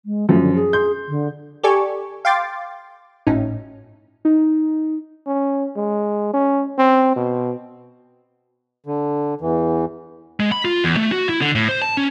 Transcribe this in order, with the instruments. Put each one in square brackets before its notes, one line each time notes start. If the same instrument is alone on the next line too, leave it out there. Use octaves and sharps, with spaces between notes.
[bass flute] G#3
[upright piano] F#2 F3 [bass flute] A3
[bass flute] D3
G#4
[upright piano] C6 G6
[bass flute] D3
[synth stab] G4 A4 D5 G#5 C#6
F5 G5 C6 D6 A6
G#1 A2 C#4 D#4
[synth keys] D#4
[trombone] C#4
G#3
C#4
C4
B2
[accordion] D3
E2 E3
[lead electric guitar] G#3
B5
F4
E2
A3
F#4
E4
D3
A2
C5
A5
C#4